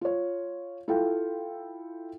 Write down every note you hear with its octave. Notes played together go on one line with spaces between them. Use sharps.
F4 C#5
E4 F4 A4 F5 G5